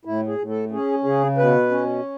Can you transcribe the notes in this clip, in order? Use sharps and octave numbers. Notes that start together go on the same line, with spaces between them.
A2 E4
G#4
A2
A4
C#4 G#4
C#3 G#4
B2 B4
C#4